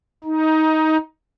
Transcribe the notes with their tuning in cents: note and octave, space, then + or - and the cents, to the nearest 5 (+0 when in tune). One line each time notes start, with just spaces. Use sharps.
D#4 +15